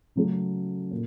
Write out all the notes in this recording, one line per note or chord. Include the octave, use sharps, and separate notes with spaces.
C#3 F#3 A3 C#4 F#4
A#2